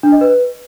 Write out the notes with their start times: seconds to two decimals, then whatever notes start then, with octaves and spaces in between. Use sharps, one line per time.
0.03 D4
0.12 D#5
0.21 B4